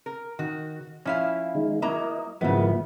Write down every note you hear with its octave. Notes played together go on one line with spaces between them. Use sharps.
A#4
D#3 F#4
F3 C#4 E4 F5
D#3 G#3 D#4
F#3 A#3 E4 A#4 D#5 A#5
G#1 C#3 F3 F#3 G#3 A#3 B3 E4